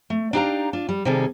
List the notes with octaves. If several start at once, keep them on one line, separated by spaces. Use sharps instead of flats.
A3
D4 D#4 G4 B4 F5 A#5
D4 F4
G3
C3 D#3 G3 G#4 A4